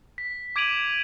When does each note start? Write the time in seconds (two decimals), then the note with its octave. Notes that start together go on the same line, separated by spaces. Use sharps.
0.18 B6
0.56 D6 G#6 D7 D#7 F7 F#7